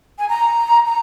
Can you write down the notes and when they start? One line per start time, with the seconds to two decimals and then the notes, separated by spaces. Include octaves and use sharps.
0.19 G#5
0.29 A#5
0.86 A#5